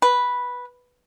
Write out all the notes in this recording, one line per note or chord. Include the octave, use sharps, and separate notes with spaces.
B4